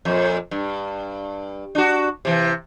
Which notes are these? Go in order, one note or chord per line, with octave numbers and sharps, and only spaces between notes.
F2 A#2
G2
D4 F#4
C3 E3